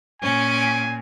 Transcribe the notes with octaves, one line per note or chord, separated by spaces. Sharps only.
A#2 C#4 G#5 D7